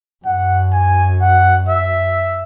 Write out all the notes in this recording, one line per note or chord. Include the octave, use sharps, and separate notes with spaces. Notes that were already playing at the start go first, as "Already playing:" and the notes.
F#2 F#5
G#5
F#5
E5